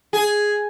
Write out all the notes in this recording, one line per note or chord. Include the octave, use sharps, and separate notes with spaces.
G#4